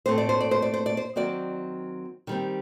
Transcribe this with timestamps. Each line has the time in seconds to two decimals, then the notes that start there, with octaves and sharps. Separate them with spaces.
0.06 A2 A3 C4 C5
0.18 D5
0.29 C5
0.41 D5
0.51 C5
0.62 D5
0.74 C5
0.86 D5
0.97 C5
1.16 D#3 F#3 C4 D5
2.27 D#3 G3 C4